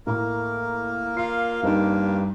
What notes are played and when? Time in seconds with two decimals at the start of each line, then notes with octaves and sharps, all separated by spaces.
0.07 A2 A#3 A#4 A#5
1.17 F4 C7
1.63 G2 C4 D#4